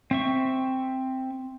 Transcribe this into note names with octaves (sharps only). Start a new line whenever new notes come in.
C4 E5 C#6